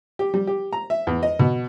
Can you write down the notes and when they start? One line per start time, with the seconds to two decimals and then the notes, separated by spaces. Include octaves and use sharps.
0.19 G4
0.34 G3
0.47 G4
0.73 A#5
0.90 E5
1.07 E2
1.23 D#5
1.39 B2